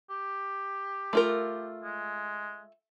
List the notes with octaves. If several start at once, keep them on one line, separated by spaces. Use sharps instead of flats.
G4
A3 F4 A#4
G#3